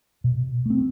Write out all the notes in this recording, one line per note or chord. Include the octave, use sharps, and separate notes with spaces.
B2
A3 C4